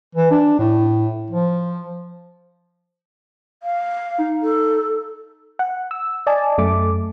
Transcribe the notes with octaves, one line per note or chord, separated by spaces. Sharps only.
E3
D4
A2
F3
F5
D#4
A4
F#5
E6
D5 D#5 G#5 A5
F#2 A3 D6